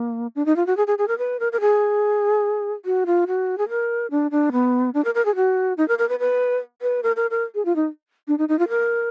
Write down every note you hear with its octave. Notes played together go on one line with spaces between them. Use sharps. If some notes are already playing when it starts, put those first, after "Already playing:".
Already playing: A#3
D4
D#4
F4
F#4
G#4
G#4
G#4
A#4
B4
A#4
A#4
G#4
F#4
F4
F#4
G#4
A#4
D4
D4
B3
D4
A#4
A#4
G#4
F#4
D#4
A#4
A#4
B4
B4
B4
A#4
A#4
A#4
G#4
F4
D#4
D4
D#4
D#4
F4
A#4